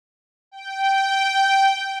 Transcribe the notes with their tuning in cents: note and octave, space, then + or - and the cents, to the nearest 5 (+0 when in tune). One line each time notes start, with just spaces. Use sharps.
G5 -10